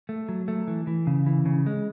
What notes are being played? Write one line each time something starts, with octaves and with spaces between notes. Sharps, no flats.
A3
F#3
A3
E3
E3
C#3
E3
C#3
G#3